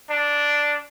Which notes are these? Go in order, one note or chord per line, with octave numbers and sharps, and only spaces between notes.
D4